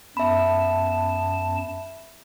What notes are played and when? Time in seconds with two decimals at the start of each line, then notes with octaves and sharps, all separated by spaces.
0.17 F#2 B3 E5 A5 B5